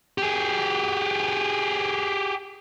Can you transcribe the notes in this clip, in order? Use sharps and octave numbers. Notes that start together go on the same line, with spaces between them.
G4 G#4